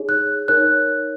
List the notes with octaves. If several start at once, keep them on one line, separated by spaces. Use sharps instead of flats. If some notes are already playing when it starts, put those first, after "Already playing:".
Already playing: D#4 G#4 C#5
F#6
D#4 A#4 C#5 F#6